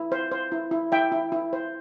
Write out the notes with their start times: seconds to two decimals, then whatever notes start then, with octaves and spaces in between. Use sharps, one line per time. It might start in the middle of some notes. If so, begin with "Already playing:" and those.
Already playing: E4
0.12 C5
0.31 C5
0.52 E4
0.71 E4
0.92 E4 E5 G5
1.12 E4
1.32 E4
1.53 C5